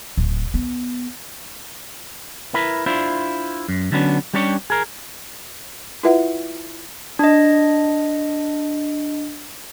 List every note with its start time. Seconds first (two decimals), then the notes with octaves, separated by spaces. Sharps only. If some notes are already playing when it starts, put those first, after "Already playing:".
0.17 D1
0.54 B3
2.54 E4 A#4 B4
2.86 D4 E4 F4 C5
3.68 F#2
3.92 D3 F#3 G3 B3 C#4 D4
4.34 G3 C#4 D4 G4 C#5
4.70 G#4 A#4
6.03 E4 F4 A#4 B4 E5 F#5
7.19 D4 D#5